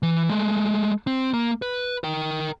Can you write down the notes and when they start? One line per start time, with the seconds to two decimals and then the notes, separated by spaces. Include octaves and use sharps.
0.03 E3
0.29 G#3 A3
1.07 C4
1.34 A#3
1.62 B4
2.04 A#4 G5